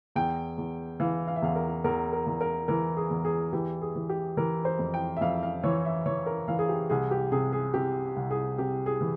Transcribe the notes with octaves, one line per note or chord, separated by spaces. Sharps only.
E2 G5
E2
E3 F5
F5
E5
E2 F5
A#4
E2 A#4
A#4
E2
A#4
E3 A#4
G#4
E2
G#4
E3 G4
G#4
E3
G4
E3 A#4
C5
F2
G5
E5
F2 F5
F5
E3 C#5
E5
E3 C#5
A#4
E3 F5
G#4
G4
C2 G#4
G4
C3 G#4
G#4
C3 G4
C2
G#4
C3 G4
G#4
E3